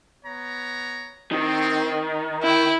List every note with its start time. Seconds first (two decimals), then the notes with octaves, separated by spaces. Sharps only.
0.24 B3 C#5 A#5
1.31 D#3 C4
2.43 E4 G5